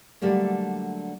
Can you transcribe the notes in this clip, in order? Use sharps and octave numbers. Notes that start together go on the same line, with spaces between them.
D3 F#3 G3 A3 A#3